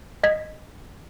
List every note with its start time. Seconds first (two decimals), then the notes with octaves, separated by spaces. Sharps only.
0.23 D#5 G#6 B6